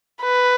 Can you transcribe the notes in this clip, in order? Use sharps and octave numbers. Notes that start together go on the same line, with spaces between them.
B4